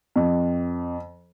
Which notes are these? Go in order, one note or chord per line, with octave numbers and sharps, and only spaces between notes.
F2